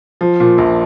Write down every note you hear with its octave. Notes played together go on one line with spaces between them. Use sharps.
F3
A#2
A#1